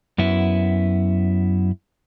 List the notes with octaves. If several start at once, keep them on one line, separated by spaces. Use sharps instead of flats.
F#2 B3 E4